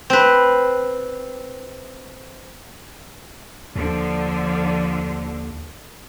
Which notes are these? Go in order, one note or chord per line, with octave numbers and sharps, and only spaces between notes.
C4 B4
D#2 D3 F3